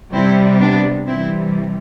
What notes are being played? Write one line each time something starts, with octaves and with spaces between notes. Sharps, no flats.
C3 G3 C4 E4
B3 D4
C3 E3 G3 C4 E4